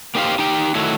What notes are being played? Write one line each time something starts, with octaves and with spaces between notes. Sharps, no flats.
A#3 D#4 G4 C5 F5
D#4 G4 G5
D#3 F#3 A3 E4